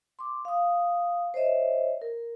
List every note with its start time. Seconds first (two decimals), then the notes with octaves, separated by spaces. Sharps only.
0.19 C6 D6
0.45 F5 D#6
1.34 C5 C#5 D#5 E5
2.02 A#4